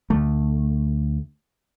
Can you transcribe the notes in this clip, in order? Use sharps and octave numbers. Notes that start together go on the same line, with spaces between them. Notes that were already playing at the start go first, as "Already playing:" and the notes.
D2 A3